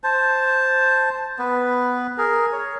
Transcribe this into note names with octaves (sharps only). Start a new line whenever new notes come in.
C5 A5
B3 B4
G#4 A#4
C#5